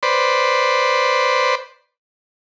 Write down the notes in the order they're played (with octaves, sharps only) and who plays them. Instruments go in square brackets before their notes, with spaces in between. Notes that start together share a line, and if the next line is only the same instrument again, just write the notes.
[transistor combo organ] B4 C5 D5